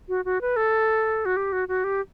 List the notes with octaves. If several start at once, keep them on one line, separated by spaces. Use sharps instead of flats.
F#4
F#4
B4
A4
F#4
G4
F#4
F#4
G4